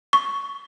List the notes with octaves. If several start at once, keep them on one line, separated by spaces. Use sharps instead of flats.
C#6